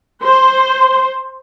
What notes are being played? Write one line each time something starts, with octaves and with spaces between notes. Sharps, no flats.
C5